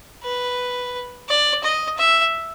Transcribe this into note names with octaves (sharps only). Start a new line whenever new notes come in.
B4
D5
D#5
E5